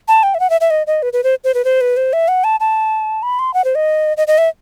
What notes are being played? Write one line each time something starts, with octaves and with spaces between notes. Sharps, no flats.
A5
G5
E5
F#5
E5
E5
D#5
D#5
B4
B4
C5
C5
B4
C5
B4
C5
E5
F#5
A5
A5
B5
C6
F#5
C5
D#5
D#5
D#5
E5